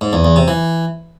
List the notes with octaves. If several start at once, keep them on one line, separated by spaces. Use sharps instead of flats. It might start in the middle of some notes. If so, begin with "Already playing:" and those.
G#2
E2
E2
C3
E3